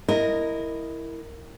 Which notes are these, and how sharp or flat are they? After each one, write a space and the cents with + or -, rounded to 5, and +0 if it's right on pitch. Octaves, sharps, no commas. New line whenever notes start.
E4 +0 A#4 -10 D#5 +0